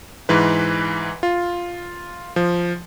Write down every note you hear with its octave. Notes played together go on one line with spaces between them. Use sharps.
G#2 E3 B4
F4
F3